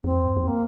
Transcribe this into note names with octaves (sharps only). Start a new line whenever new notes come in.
F2 C4
E2
G2
F2
A#3